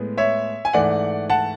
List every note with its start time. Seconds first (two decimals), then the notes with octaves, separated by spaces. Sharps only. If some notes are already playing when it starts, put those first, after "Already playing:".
Already playing: A2 G#3 B3
0.17 C#5 E5
0.65 G#5
0.73 G#2 E3 A3 D5 F#5
1.30 F#5 A5